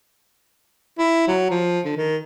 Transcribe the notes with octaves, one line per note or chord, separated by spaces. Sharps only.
E4
F#3
F3
D3
D#3